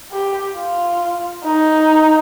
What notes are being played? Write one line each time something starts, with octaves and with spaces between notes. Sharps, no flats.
G4
F4
D#4